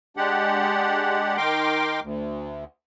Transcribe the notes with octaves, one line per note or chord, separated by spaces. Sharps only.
G#3 D4 G4 F#5
D#3 A#4 G5 C6 D6
D2